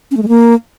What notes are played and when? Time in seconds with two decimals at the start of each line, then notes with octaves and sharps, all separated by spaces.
0.11 C#4
0.17 A3
0.23 G#3
0.28 A#3